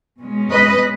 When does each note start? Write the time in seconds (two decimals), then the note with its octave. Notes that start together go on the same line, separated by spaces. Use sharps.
0.20 B2 G#3 C#4
0.50 B4 D#5